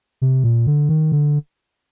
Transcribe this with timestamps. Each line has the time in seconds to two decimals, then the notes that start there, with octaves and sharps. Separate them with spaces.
0.22 C3
0.44 A#2
0.67 D3
0.89 D#3
1.12 D3